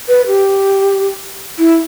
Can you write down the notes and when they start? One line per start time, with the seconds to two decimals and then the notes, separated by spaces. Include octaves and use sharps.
0.09 B4
0.28 G4
1.59 E4